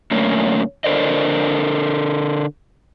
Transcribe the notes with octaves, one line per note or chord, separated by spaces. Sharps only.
F#2 D3 A3 A#3 C#4
D3 A4 A#4 C5 D5 D#5